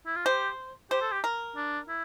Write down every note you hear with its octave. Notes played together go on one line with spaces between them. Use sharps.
E4
F4
G4 C5
G4 C5
A4
G4
A#4
D4
E4